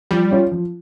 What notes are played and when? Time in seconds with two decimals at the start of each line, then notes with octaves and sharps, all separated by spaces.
0.11 F3 G3
0.31 C#4 F4
0.52 F3